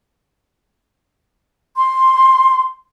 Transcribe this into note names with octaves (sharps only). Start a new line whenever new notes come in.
C6